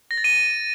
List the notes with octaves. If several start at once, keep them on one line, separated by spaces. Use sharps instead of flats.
A#6
A6
D#7